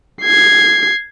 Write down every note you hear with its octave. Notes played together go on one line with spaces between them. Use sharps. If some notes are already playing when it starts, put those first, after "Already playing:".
G#6 C7